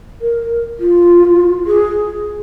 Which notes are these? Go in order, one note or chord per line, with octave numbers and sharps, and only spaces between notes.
A#4
F4
G#4